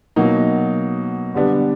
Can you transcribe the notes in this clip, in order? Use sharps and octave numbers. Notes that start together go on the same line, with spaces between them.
B2 F#3 A#3 D#4
D3 G3 B3 D4